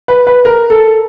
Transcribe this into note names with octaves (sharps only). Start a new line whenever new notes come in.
B4
B4
A#4
A4